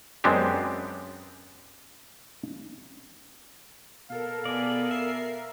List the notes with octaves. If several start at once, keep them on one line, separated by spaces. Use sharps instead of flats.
F#2 G#3 B3 C4 D4 G4
B2 A4 A#4 F5
B3 G#4 D5
A#4 E5 C7